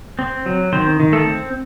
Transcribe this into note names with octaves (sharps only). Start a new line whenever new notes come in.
C4
F#3
D#3 C4 C5
D#3
A3 A4
C4